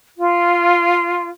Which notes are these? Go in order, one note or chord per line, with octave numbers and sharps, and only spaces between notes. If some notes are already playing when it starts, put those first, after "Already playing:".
F4